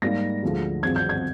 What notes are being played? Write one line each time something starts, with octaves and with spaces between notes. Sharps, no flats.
G#2 G3 A#3 D#4 A#6
D2 D3 F3 G#3
G#1 G2 F3 G#3 C4 G#6
G6
G#6